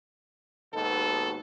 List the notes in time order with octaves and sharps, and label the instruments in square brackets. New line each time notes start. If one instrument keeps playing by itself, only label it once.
[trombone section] D#2 G#2 B2 [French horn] A4